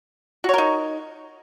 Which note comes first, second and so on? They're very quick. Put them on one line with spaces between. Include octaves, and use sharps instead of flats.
F#4 C#5 A#4 D#4